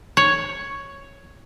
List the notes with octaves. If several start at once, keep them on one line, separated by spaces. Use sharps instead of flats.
C#5